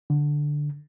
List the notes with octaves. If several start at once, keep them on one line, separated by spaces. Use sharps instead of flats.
D3